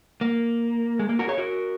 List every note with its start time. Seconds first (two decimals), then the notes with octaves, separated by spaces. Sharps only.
0.21 A#3
0.99 G#3
1.09 A#3
1.19 F#4 A#4
1.28 G#4 C#5
1.38 F#4 A#4